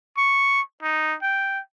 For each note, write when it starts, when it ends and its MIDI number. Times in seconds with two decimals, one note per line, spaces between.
0.18 0.61 85
0.83 1.15 63
1.23 1.60 79